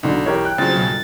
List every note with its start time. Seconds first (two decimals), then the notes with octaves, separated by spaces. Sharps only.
0.03 B1 D3 F#3 D#4
0.26 E3 G4 A#4 C#5
0.45 G5 F#6
0.58 D2 C#3 F#3 F4 C5 A6
0.75 B1
0.88 G1